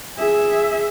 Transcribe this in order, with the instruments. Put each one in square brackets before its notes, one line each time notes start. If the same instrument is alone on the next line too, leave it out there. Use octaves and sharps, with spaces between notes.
[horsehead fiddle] G#4 E5